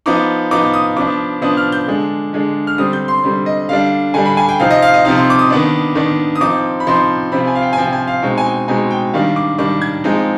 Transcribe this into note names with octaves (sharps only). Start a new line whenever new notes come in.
F3 B3 D#4 D6
F3 B3 D#4 D6
D#6
F3 B3 D4 D6
F3 B3 D4 D#6
F6
G6
D3 G#3 D4
D3 G#3 D4
F6
D3 G3 C4 D#6
G6
C6
D3 G3 C4
D#5
D3 G3 D4 F5
D3 G3 D4 G#5
B5
G#5
G5
C3 F3 C4 D#4 F5
D#5
F5
D#5
C3 F3 C4 D#4 F5
C6
D6
D#6
D#3 B3 D4
D#3 B3 D4
D#6
F3 C4 D#4 D6
B5
F3 C4 D#4 C6
C3 F3 C4 B5
G#5
F5
G5
G#5
C3 F3 C4 G5
G#5
F5
B2 G#3 C4 D#4 G5
G#5
G5
B2 G#3 C4 D#4 G#5
G5
D#3 G3 D4 F5
D6
D#3 G3 D4 D6
G#6
F3 G#3 C4 D#4